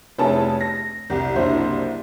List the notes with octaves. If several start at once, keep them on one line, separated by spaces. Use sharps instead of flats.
F1 B3 E4 G#4 C#5 A5
A#6
C2 G4
F#1 C2 D4 E4 C5